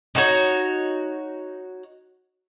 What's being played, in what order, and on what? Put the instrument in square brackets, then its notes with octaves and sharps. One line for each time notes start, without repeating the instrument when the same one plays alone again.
[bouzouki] D#4 F#4 C5 C#5